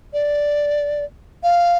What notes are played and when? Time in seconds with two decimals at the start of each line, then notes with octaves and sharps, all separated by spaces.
0.13 D5
1.43 F5